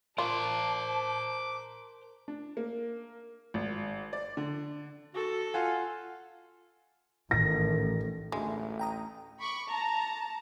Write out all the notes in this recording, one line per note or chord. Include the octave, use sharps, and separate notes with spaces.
F4 A#4 C5 A5 D6
D4
A#3
G#1
D5
D3
F#4 A4
F4 F5 F#5 G#5
A1 G#2 D#3 A#6
A1 D2 G#3 A3
G5 A#5 D#6
B5 C#6 D6
A5 A#5